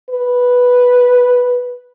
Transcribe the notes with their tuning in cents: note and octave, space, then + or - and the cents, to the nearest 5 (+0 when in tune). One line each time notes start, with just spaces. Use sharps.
B4 -5